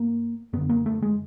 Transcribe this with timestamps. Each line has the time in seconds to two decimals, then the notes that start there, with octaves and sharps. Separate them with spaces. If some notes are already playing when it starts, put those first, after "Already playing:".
Already playing: G2 A#3
0.53 F#2 D3 B3
0.69 A#3
0.86 A3
1.02 G#3